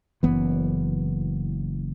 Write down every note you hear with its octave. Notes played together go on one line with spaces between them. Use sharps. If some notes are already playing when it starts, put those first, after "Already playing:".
F#1 F#2 E3 B3